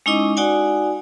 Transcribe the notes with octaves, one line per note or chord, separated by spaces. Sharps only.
G#3 C#4 D#4 E4 D#5 D6
D#4 F#4 D5 F#5 G#5